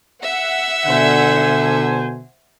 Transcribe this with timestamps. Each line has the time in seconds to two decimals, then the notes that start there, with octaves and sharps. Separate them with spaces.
0.23 E5 F#5
0.87 B2 D3 C5 G#5